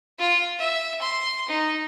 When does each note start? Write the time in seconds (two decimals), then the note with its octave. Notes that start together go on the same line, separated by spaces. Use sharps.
0.19 F4
0.59 E5
1.01 C6
1.48 D#4